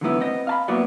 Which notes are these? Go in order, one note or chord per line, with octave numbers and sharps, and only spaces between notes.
D3 E3 F#3 A3 B3 E4
B3 C4 D#5
F5 A5 B5
F#3 A#3 B3 E4 F#4 D5